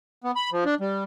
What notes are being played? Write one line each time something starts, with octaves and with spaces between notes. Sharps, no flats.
B3
B5
F3
D4
G3